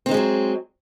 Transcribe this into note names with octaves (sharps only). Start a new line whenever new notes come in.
D#3 F3 F#3 G#3 C4